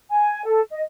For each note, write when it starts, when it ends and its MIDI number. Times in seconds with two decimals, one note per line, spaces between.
0.09 0.43 80
0.45 0.61 69
0.70 0.81 75